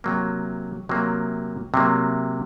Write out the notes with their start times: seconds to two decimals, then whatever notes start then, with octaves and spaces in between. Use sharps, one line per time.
0.04 C3 F#3 A#3
0.89 C3 F#3 A#3
1.74 C3 F#3 A#3